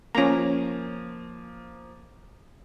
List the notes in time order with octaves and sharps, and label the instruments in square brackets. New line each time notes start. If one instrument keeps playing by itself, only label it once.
[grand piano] F3 A#3 [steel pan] C#4 A#5